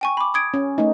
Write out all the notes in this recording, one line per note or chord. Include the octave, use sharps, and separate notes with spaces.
G5 G#5 C#6
B5 D6
D#6 G#6 D7
C#4
A3 D#4